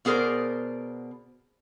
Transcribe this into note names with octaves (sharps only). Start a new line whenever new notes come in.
B2 B3 G#4 A#4 C5 D5